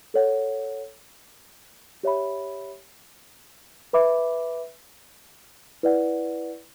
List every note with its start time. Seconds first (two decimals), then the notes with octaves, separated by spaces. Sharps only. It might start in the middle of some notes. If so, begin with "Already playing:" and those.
0.14 A4 C#5 F#5
2.03 G4 C#5 E5 B5
3.93 B4 E5 B5 D6
5.83 E4 B4 D5 F#5